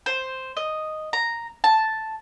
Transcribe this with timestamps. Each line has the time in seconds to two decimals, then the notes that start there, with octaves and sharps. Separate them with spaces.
0.06 C5
0.57 D#5
1.13 A#5
1.64 A5